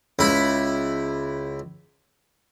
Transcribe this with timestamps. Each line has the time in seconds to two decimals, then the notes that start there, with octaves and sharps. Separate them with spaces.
0.19 C#2 E4 B5